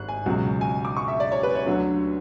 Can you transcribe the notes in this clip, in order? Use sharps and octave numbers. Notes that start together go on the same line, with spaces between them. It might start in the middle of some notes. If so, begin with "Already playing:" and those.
Already playing: G#1 F#6
G#5
C#2 B2 F#3
G#5
D6
C#6
E5
D5
C#5
B4
C#5
D2 D3 F#3